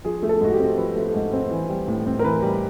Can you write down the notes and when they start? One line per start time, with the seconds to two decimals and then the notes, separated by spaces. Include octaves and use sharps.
0.05 F3 G#4
0.23 A3
0.29 A4
0.41 G#2 F#4
0.53 G4
0.59 C4
0.77 F3 B4
0.96 A3
1.14 G#2
1.33 C4
1.51 E3
1.69 G3
1.87 A2
2.06 C4
2.19 A#4
2.24 E3 B4
2.42 G3